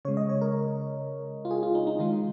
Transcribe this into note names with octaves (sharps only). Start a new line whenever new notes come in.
C#3 G#3 C#5
D#5
C#5
A#4
F4
G#4
F4
D#4
D#4
D#3 G#3 F4